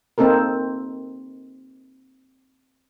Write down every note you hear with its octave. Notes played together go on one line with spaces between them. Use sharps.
A#3 C4 D#4 A4 A#4